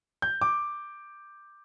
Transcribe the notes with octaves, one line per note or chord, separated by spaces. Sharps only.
G6
D6